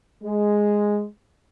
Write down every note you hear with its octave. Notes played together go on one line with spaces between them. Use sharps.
G#3